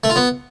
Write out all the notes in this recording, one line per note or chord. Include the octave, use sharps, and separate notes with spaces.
A3
F4
B3